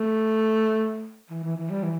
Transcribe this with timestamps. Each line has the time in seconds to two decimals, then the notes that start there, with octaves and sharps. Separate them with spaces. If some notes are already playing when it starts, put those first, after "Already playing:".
Already playing: A3
1.30 E3
1.43 E3
1.57 E3
1.70 G3
1.83 E3